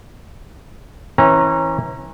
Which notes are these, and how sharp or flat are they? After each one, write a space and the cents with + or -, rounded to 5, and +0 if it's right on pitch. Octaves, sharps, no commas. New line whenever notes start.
E3 -25 C#4 -35 A#5 +0